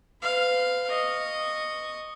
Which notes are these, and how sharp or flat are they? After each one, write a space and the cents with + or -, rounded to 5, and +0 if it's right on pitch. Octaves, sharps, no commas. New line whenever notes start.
B4 +40 F5 +0
D#5 -10 C#6 +0